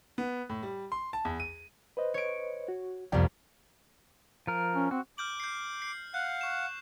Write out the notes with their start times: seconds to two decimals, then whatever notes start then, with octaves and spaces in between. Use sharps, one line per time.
0.18 B3
0.50 A2
0.63 G3
0.92 C6
1.13 A5
1.25 E2
1.40 D#7
1.97 B4 C5 D#5
2.14 C#5 D7
2.68 F#4
3.12 C2 F2 B3 D5 G5
4.47 F3 A#4
4.76 C#4
4.91 C4 F#4
5.18 D6 F6 G6 F#7
5.40 G6 C7
5.82 C7
6.14 F5 F#5 F#6
6.41 C#6 E7